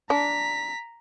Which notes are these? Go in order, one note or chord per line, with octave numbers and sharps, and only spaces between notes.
D4 A#5 B6